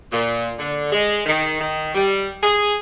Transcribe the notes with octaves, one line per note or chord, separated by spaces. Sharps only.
A#2
D3
G#3
D#3
D#3
G3
G#4